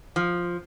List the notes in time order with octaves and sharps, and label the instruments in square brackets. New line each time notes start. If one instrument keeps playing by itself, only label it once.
[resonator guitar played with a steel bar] F3